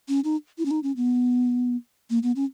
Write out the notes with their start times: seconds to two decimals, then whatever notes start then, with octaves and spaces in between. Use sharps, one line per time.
0.08 C#4
0.24 D#4
0.58 E4
0.65 C#4
0.71 D#4
0.83 C#4
0.96 B3
2.10 A#3
2.23 B3
2.36 C#4